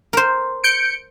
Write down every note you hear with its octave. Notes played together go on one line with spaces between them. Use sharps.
A#4 C5
G6 C#7 D7